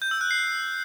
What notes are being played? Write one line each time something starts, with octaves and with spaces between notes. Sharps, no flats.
G6
E6
F#6
C7